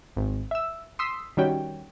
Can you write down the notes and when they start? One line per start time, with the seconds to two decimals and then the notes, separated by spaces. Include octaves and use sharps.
0.17 G#1
0.51 E5 E6
0.99 C6 D#6 E6 B6 C7
1.37 D#3 G3 C#4 F#4 C#5 G5